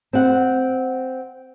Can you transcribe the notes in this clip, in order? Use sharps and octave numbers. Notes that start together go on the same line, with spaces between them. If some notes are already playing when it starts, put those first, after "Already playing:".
C4 F#5